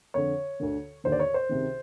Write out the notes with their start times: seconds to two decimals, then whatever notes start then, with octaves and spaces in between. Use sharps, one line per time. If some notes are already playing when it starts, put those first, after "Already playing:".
0.14 F2 D3 C#5
0.60 D2 D3
1.04 D#2 D3 C5
1.12 D5
1.20 C#5
1.34 C5
1.49 C#2 C3 D#3